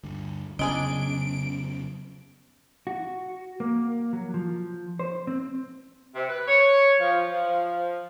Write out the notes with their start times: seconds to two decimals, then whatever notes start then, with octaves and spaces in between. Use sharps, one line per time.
0.04 D2 G2 D3
0.59 F2 C#3 F#3 B3 D4 G#4 D#5 D7
2.87 F#4
3.60 A#3
4.13 F#3
4.34 F3
4.99 C5
5.27 C4
6.15 C3
6.29 B4
6.47 C#5
7.00 F3
7.31 F3